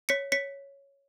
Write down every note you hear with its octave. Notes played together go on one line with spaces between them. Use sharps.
C#5 B6 C#7
C#5 B6 C#7